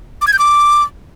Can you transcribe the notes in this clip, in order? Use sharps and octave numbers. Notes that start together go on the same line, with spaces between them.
D6
G#6
G6
D6